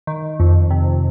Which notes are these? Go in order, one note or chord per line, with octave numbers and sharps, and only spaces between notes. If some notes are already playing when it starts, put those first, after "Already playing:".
D#3
F2
C3